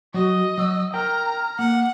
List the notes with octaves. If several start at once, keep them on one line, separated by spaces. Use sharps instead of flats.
F#3 F#4 D#5
F#3 E6
A#4 G5 A#5 F6
A#3 F#5